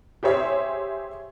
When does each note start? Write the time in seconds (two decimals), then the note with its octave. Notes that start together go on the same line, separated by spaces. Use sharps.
0.23 G4 G#4 C5 C#5 E5